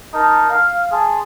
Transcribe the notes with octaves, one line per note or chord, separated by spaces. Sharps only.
D#4 A#4 A5
F5
G#4 A5 C6